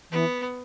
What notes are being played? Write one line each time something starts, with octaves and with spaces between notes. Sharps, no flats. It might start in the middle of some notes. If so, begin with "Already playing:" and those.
E3 B3